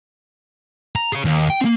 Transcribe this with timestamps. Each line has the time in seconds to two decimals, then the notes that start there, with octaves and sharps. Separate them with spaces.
0.96 A#5
1.12 G#4 C#5
1.25 D#2
1.50 G5
1.61 A#3 C4